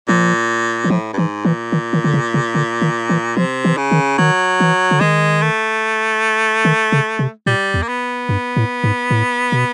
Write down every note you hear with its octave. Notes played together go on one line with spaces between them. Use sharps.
A#2 F3
E3
A2 F3
G2
G#2 E3
A#2 E3
D#3
D#3
D3
C#3
C#3
D3
D#3
E3
C3 F3
E3
C#3
D#3
D#3 F#3
E3
D3
D#3 G#3
A3
D#3
C#3
C3
A#2 G3
E2
A#3
B3
G2
A2
G#2
A2
B2